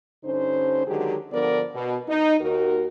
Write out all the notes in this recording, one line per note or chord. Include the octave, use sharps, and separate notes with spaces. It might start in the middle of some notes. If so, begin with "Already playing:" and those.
G2 D3 C#4 D#4 C5
D3 D#3 F#3 G#3 G4 G#4
G2 D3 F3 B3 A#4 D5
B2
D#4
D#2 F#4 A#4